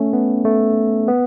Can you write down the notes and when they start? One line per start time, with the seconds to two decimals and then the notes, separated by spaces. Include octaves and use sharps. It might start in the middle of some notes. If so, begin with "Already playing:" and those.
Already playing: A3 C#4
0.13 B3
0.45 A3
1.08 B3